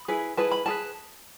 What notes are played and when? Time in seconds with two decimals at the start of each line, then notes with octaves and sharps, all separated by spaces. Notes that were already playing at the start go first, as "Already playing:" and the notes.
Already playing: B5
0.08 E4 G#4 B4
0.37 E4 G#4 B4 A5
0.51 B5
0.66 E4 G#4 B4 A5